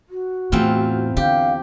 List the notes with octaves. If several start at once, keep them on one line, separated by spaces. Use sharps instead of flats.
F#4
E2 A2 C4 F4
D3 G4 F5